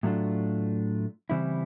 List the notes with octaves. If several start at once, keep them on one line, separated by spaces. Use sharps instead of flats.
A2 F#3 A3 D4 F4
C#3 E3 G3 C4 E4